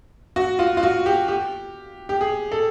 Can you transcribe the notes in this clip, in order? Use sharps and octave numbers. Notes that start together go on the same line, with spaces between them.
F#4
F4
F4
F#4
G4
G4
G4
G#4
A4